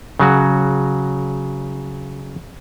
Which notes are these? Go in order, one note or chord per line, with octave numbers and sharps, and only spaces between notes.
C#3 F#3 F#4